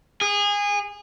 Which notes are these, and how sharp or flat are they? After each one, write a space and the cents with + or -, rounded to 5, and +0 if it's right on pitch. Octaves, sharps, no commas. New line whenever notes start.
G#4 -25